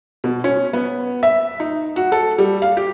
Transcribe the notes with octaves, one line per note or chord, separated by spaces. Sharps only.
B2
C#4
B3
E5
D#4
F#4
A4
G3
F5
G4